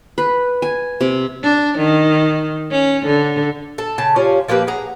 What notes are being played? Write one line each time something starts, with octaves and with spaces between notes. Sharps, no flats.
B4
G#5
C3
D4
D#3
C#4
D3
A4
C#3 A5
G3 C#4 F4
F3 A#3 G4 B4
G#4 F#5 A#5